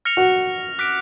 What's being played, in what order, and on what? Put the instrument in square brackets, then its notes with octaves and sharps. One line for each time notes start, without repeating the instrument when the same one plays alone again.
[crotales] F6 A#6 C#7 F7
[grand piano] F#4
[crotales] D6 F#6 B6 D7